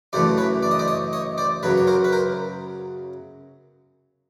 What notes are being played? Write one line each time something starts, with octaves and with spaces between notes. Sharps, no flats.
F#2 C#3 E3 A3 C5 D5
B4 C#5
D5
D#5
C5 D5
C#5 D#5
C#5 D#5
C5 D5
F#2 C#3 F#3 B4 C#5
C#5
A#4 C5
B4
A#4 C5